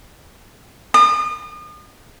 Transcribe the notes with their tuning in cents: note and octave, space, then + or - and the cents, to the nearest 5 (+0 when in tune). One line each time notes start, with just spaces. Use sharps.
D#6 -40